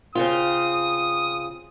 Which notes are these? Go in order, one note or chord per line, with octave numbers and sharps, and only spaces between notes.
C#3 C4 F4 D#6